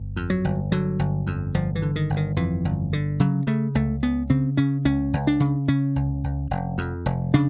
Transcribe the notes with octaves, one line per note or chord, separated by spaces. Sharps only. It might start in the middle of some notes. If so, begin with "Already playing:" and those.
Already playing: G1
F2
F#3
G1
D3 F#3
G1
F2
G1 F3
E3
D3
D#3
G1
D#3
F2 E3
G1
D3
C#3 F#3
C#3 A3
C#2 A3
C#2 B3
C#3 C4
C#3 C#4
C#2 C#4
C#2
D4
C#3
C#3 C#4
C#2
C#2
F1
F2
F1
C#3 D4